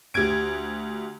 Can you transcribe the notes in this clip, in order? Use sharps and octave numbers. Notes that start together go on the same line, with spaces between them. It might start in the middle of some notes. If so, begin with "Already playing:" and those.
D2 G4 G#6 D7